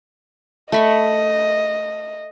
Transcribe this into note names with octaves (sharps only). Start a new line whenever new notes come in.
A3 D#5 B5 C#6